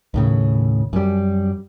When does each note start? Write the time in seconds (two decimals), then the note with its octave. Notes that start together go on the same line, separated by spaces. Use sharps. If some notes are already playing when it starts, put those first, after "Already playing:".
0.14 D#2 A2 C#3
0.93 F#2 G3